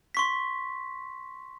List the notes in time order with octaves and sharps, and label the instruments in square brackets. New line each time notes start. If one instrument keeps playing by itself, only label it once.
[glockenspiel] C6 C#6 B6